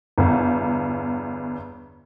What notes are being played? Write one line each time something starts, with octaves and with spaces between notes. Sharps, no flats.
G1 E2